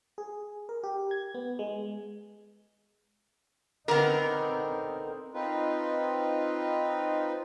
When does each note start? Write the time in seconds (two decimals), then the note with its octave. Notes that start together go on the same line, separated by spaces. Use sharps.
0.18 G#4
0.69 A#4
0.83 G4
1.11 G#6
1.34 B3
1.59 G#3
3.88 D3 B3 C4 D#4 A#4
5.34 C4 D#4 F4 B4